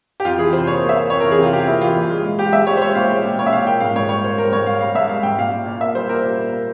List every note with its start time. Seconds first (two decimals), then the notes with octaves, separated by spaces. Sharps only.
0.20 G4
0.25 F2 F4
0.38 E3 G#4
0.53 C3 C5
0.67 A#3 C#5
0.82 A#3
0.89 E5
0.96 A#3
1.10 F2 C#5
1.20 E3 A#4
1.31 G#4
1.39 C3 F4
1.52 C3 G4
1.68 A#3 E4
1.81 E3 F4
1.96 A#2
2.10 G#3
2.25 G#3
2.39 G#3 G4
2.53 G#3 E5
2.67 G#3 C#5
2.77 C5
2.81 G#3 C#5
2.95 A#2 F5
3.10 G#3 G5
3.25 A#2
3.38 A#2 C#5
3.46 E5
3.53 A#2 F5
3.67 A#3 G5
3.81 G#2 F5
3.96 G#2 C#5
4.09 G3 C#5
4.24 A#3 C5
4.38 G#2 A#4
4.52 G#2 C#5
4.67 G#2 F5
4.80 G3 F5
4.95 G#2 E5
5.09 G#2 F5
5.23 G#2 G5
5.38 A#2 F5
5.52 A#2
5.66 A#2
5.81 A#3 E5
5.95 G3 C5
6.09 A#2 A#4
6.24 A#2
6.39 A#3
6.52 A#3